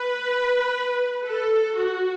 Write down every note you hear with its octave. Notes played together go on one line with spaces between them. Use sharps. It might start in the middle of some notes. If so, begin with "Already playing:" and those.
Already playing: B4
A4
F#4